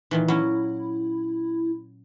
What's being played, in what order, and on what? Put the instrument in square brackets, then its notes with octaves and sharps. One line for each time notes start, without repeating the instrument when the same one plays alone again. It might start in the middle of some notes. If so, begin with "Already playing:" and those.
[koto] A#2 D#3 E3
[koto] F#3 C#4 [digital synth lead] E4